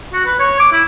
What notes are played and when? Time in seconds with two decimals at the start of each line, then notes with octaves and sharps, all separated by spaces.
0.13 F#4
0.26 B4
0.40 C#5
0.60 D6
0.72 E4